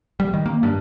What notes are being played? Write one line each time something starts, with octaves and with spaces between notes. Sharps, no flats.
G3
D#3
A#3
G2